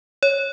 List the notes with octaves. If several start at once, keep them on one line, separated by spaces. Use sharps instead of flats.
C#5